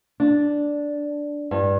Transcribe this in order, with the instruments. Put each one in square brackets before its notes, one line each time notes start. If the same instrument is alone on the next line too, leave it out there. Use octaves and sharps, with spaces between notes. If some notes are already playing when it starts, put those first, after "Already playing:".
[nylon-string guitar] D4
G2